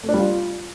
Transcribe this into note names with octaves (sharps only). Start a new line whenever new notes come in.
A3
D4
G3
F4